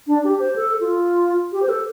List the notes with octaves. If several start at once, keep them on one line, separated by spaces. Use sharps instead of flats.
D4
G4
C5
A4
F4
G4
C5
A4